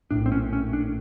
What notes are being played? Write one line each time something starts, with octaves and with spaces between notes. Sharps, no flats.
A#1 A2 D4
C4
C#4
C#4
D4